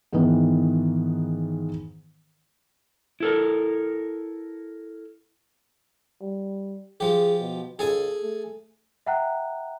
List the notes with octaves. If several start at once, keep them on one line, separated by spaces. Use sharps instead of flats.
G#2 D#3 E3 B3
E4 A4 A#4
G3
F3 G4 G#4
B2
C#2 G#4 A4 G#5
A3
E5 F#5 G5 A#5 F#6